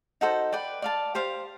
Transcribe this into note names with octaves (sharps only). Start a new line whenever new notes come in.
D#4 F#4 A4 C5
B4 D5 G5
D5 F5 A5
G4 C5 F5